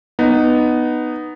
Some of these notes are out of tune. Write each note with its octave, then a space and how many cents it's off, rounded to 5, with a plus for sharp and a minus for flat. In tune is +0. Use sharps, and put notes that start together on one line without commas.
B3 +0 D#4 -10